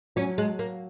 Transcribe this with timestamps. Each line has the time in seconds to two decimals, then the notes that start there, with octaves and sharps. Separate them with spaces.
0.16 F#3 C#4
0.38 G#3
0.59 A#3